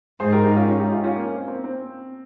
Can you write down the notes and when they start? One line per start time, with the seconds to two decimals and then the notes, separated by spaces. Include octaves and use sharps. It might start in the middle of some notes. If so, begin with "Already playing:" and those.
0.20 G#2 G#4 C5
0.33 G4 A#4
0.44 D#4 G4
0.56 C#4 F4
0.68 C#4 F4
0.80 D#4 G4
0.92 C#4 F4
1.04 C#4 F4
1.16 A#3
1.33 C4
1.48 C4
1.64 C4